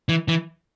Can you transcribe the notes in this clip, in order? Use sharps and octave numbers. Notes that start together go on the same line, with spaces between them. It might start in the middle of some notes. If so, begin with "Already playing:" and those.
E3
E3